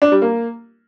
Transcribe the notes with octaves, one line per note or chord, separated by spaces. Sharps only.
D4
G3
A#3